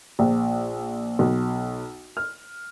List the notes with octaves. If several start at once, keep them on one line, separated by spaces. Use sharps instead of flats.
A#1
B1
F6